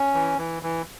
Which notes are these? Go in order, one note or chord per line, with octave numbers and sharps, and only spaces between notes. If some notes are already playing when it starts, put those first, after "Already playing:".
Already playing: C#4
E3
E3
E3